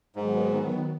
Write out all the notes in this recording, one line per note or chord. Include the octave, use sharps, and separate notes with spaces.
G#2 D#3 F#3 B3